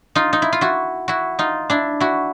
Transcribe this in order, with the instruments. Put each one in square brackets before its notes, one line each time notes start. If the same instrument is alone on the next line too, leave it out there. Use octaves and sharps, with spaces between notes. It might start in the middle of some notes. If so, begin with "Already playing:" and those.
[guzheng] D#4 F4
D#4
E4
F4
E4 F#4
E4 F#4
D#4 F4
D4 E4
E4 F#4